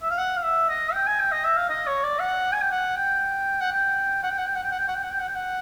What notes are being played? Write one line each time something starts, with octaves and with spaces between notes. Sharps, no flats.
E5
F5
F#5
F5
E5
D#5
G5
G#5
G5
D#5
E5
F5
D#5
C#5
D5
F#5
G#5
G5
F#5
G5
F#5
G5
F#5
G5
F#5
G5
F#5
G5
F#5
G5
F#5
G5
F#5
G5
F#5
G5
F#5